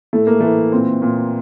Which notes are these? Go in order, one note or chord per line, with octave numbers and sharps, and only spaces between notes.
A2 A3
A#3
E3 A3
A#2 C4
A#2